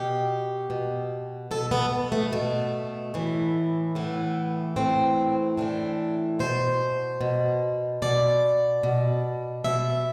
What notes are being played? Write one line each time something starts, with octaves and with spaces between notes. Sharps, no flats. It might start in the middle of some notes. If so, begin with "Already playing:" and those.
Already playing: B2 G4
B2
B2 A4
B3
A3
B2 A3
A2 E3
A2 E3 B3
A2 E3 C4
A2 E3 D4
B2 C5
B2
B2 D5
B2
B2 E5